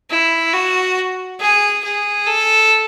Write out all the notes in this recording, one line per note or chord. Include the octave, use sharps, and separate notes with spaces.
E4
F#4
G#4
G#4
A4